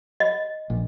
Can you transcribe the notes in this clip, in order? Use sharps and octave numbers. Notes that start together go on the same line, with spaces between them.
D#5
A#1